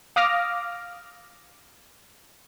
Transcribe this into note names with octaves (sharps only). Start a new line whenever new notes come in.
F5 D6 D#6 F6 A#6